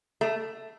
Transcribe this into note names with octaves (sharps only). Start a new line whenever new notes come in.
A3